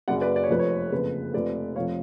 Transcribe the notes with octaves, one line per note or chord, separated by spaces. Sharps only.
F#1 F#2 C#3 D5 F#5
B4 D5
D5
C#5
F1 F2 F3 B4
C#5
F#1 F2 C#3 B4
F1 F2 F3 B4 D5
F1 F2 F3 C#5 F5